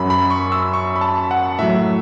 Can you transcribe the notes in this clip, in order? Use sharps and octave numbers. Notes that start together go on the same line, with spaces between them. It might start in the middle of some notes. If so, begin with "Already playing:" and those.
Already playing: F#2 F#3 B5
B5
C#6
E6
C#6
B5
A5
F#5
A2 F#3 E5